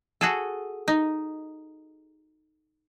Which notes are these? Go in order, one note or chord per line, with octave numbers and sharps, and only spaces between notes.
F#4 G#4 A4
D#4